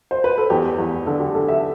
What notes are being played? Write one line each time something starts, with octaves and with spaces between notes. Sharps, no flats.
C5
B4
A4
E2 G4
E2
D3 A4
G4
D3 A4
E5